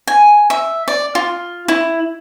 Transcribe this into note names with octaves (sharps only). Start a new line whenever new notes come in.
G#5
E5
D5
F4
E4